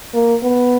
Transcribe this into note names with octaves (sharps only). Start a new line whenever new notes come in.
A#3
B3